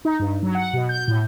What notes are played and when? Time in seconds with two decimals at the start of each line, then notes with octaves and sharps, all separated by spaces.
0.05 D#4
0.19 G2
0.43 F#3
0.55 F#5
0.73 B2
0.89 G6
1.08 A2